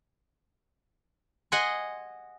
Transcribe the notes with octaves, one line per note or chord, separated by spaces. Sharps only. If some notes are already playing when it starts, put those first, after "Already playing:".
D#5 F#5 G#5 C6